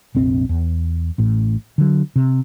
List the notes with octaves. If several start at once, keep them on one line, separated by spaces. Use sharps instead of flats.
F1 A#1 C4
E2
A1 A2
D3 F#3
C3